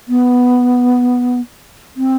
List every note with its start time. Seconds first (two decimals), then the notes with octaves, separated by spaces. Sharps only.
0.08 B3
1.96 C4